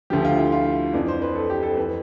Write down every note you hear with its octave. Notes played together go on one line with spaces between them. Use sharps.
D2 D3 F3 G4
F4
E4
F4
F2 E3 D4
C5
B4
A4
G4
A4
F2 E3 B4